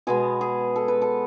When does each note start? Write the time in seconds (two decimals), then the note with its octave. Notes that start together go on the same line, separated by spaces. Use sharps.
0.07 B2 G#3 B3 G#4
0.41 G#4
0.76 A4
0.88 B4
1.02 A4